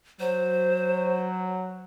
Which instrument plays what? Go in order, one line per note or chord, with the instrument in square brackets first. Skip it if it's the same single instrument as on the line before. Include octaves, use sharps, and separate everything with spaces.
[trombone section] F#3 [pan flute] C5